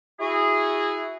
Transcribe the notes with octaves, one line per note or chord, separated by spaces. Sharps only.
E4 F#4 G#4